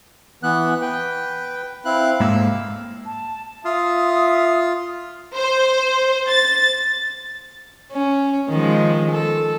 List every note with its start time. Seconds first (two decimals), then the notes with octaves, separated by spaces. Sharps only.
0.43 E3 B3 F#6
0.81 B4 G5
1.85 C4 E4 F5 F#6
2.20 G#2 A#3 E6
3.05 A5
3.65 F4 E5 D#6
5.35 C5
6.29 A6
7.92 C#4
8.49 D#3 F3 G#3
9.11 A4